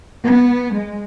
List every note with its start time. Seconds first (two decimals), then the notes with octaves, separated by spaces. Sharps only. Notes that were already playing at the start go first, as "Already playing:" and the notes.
0.23 B3
0.74 G#3